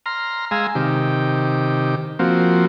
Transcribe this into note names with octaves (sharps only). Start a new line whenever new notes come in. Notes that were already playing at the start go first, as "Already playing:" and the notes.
A#5 C6 F6
G#3 F5 G#5 A#5 C6 E6
C3 D#3 G4
F3 A#3 C4 F#4